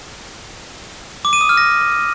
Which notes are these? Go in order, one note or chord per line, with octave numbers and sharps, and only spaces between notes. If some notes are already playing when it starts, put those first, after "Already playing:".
D6
D#7
D#6
F6
A#6